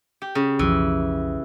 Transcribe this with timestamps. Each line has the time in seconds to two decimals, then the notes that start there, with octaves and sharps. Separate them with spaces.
0.22 G4
0.35 C#3
0.59 B1 F2 E3 F3